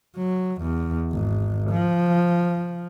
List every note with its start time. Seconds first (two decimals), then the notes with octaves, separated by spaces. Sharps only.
0.16 F#3
0.62 E2
1.12 G#1
1.71 F3